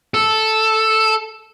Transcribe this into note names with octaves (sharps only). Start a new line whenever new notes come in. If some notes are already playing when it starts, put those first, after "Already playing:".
A4